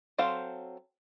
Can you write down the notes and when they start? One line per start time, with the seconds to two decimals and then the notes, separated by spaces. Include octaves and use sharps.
0.18 F#3 C4 A4 C5 F5